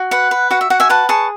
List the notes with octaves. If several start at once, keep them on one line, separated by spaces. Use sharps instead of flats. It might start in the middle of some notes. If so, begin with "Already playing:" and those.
Already playing: F#4
B4 F#5
B4
F#4 F#5
E5
F#4 F#5
E5 G#5
B4 F#5 A5
G#4 A5 C#6